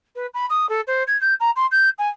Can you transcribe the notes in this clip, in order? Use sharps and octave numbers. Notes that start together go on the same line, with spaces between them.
B4
B5
D#6
A4
C5
G#6
G6
A#5
C6
G6
G#5